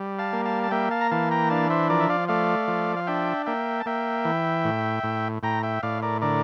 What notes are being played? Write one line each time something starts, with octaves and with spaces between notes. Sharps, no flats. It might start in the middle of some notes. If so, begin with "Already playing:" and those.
Already playing: G3
F5 A5
A#3
F5 A5
A5
A#3 E5 G5
F5 A5
A#5
E3 F5 A5
G5 A#5
D4 F5 A5
C5 E5
F3 A#4 D5
E5
D5 F5
A3 D5 F5
F3
F5
D4 E5 G5
A#3 E5 G5
A5
A#3 E5 G5
E3
A2
A2
A2 G5 A#5
E5 G5
A2 D5 F5
A#4 D5
D3 A#4 D5